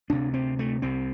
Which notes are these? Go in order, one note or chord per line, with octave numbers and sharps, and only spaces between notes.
D2 C3 D4
C4
A3
C2 C3 C4